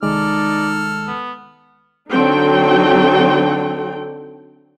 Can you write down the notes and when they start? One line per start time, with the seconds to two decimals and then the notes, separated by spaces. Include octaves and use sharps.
0.03 C2 D#3 G#3 D#4 A4 D5 F6
1.07 B3
2.10 D3 F#3 C4 D#4 A4 G5